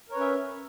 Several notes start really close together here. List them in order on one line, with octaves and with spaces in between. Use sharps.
A#4 C#5 B4 C#4 E5